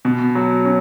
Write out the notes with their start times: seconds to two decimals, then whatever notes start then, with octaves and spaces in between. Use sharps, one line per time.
0.05 B2
0.35 F#3
0.65 C#4